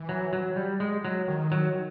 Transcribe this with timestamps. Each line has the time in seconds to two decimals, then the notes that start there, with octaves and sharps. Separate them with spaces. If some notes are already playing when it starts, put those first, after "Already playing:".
Already playing: E3
0.09 F#3
0.33 F#3
0.56 G3
0.80 G#3
1.05 F#3
1.28 D#3
1.52 F#3